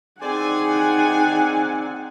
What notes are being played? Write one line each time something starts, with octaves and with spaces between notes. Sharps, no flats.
C4 D#4 G#4 C5 D5 F#5 G#5